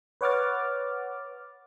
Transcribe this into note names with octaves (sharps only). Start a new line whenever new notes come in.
B4 C#5 F#5 D6 F6 A6